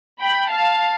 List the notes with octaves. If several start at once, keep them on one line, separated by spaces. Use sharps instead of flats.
G5 B5
F5 A5